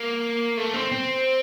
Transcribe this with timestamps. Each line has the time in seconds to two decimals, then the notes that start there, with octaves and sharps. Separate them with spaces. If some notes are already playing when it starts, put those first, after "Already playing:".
Already playing: A#3
0.57 A3
0.74 C4
0.92 C4